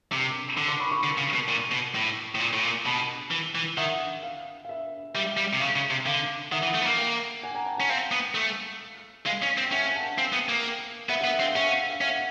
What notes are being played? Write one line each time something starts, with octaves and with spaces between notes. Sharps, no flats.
C3 D6 E6
D3 D6 E6
C6 D6
B5 C#6
B5 C#6
D3
C#3
B2
A#2
B2
A2
A2
A#2
A2
A#2
B2 A5 B5
E3
E3
D#3 E5 F#5
F5
F5
E5
G3 E5
G3
C3
C#3 F5
C#3
C3
D3 F5
D#3 E5 F#5
E3
A3
B3
A#3
F5 G5
F#5 G#5
G#5 A#5
G5 A5
C#4 F#5 G#5
C4 F5
B3
A3
G#3 F5
C#4
C4
G5
C#4 E5 F#5
F#5 G#5
G5 A5
C4 F5 G5
B3
A#3
B3 E5 F#5
E5 F#5
B3
E5
C4
F5
C#4 E5 F#5
F5
E5
F5
C#4 E5 F#5